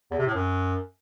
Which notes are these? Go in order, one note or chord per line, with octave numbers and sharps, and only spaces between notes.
E2
C3
A2
F#2